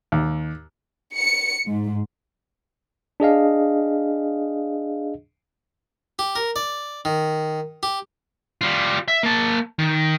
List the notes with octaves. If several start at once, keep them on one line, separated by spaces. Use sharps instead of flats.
D#2
C#7
G#2
D4 G#4 D#5 F5
G4
A#4
D5
D#3
G4
G3 F4
E5
A#3 A5
D#3